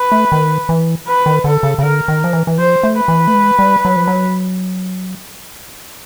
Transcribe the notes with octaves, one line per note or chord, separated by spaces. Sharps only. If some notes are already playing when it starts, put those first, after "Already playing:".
Already playing: B4
A3
D#3
E3
B4
D#3
D3 A4
C#3
C#3
D3 A#4
D#3
F3
E3
E3
F3 C5
A3
B4
E3
A3
G#3
G3
F#3
F3
F#3